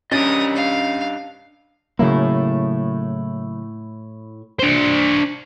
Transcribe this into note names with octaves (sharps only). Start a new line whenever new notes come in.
C#4 D4 G4 A#4 D#5 D#6 A6
F5
A2 C#3 F#3 A#3 E4
D4 C5